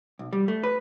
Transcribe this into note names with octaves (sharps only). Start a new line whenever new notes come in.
B1
G3
A3
B4